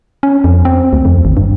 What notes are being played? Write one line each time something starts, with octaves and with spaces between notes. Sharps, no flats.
C#4
F2
C4
D2
F2
G#1
G2